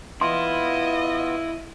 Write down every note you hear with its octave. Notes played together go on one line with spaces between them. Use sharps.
B3 E4 F4 D#5 C6